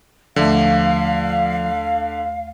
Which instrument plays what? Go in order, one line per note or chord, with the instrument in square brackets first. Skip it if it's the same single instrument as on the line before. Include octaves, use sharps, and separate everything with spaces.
[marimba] D#2 A3 E5 [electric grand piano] D3 [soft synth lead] F3 [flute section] F5